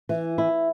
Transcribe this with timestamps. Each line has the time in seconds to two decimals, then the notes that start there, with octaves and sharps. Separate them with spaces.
0.09 E3
0.38 E4